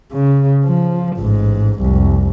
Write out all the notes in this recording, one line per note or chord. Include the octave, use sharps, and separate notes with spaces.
C#3
F3
A1 G#2
F1 C2